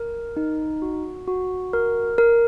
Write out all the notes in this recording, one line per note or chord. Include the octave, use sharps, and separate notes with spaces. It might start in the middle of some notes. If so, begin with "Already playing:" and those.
Already playing: A#4
D#4
F#4
F#4
A#4
A#4